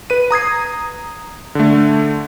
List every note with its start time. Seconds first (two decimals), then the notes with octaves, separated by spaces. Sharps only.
0.10 B4 D#7
0.31 A#5 D#6 G#6 C7
1.55 D3 A3